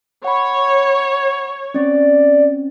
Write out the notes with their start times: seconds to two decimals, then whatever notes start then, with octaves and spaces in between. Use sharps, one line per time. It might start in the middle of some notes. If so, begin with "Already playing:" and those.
0.25 C#5 F#5 B5
1.74 C4 C#4 D5